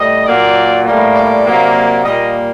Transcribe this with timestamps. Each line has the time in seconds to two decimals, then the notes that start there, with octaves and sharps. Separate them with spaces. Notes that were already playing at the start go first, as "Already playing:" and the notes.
Already playing: A2 G3 D#5
0.26 A#2 F#3 A#3 D5
0.85 A2 G3 A#3
1.14 D5
1.44 C3 F#3 A#3
2.03 A#2 G3 A#3 D#5